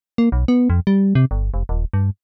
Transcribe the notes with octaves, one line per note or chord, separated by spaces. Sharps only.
A#3
B1
B3
F2
G3
C3
G1
F1
D#1
G2